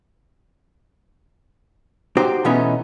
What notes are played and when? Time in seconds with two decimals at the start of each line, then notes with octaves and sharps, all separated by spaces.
2.17 D#4 F#4 G4 C5
2.45 B2 E3 A3 B3 C#4 D#4